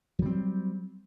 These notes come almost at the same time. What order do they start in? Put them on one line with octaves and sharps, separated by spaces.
F#3 G3 C4